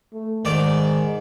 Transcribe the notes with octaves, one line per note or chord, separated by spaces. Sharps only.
A3
G#2 D#3 D5 D6